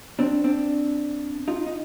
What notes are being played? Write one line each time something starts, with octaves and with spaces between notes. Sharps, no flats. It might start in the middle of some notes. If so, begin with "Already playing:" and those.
C4 D4
C4 D4
D#4 F4
D#4